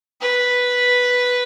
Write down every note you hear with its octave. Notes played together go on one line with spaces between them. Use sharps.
B4